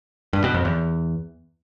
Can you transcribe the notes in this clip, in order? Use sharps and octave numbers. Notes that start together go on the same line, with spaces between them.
G2
B2
F2
E2